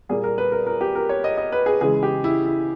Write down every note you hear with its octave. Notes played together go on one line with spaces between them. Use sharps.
A#2 G3 A#3 G#4
A#4
B4
A#4
A#4
G4
A#4
C#5
D#5
D#5
B4
G#4
C#3 E3 G#3 G#4
G4
E4
E4